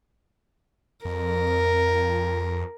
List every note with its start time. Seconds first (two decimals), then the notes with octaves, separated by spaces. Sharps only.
1.05 F2 A#4